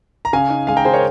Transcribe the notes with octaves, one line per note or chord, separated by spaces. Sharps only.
A#5
C#3 F5 G#5
D#4
G#3 F5 G#5
G5 A#5
C#3 G#4 C5
A#4 C#5